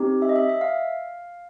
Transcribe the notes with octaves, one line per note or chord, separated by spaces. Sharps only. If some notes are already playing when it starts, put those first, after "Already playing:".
Already playing: C4 D#4 G4
E5
D#5
E5
E5
F5